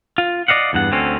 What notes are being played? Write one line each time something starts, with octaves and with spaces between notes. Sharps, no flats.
F4
D5 D#5 F5 F#5
E2 G2 F#5
D2 D3 C4 C#4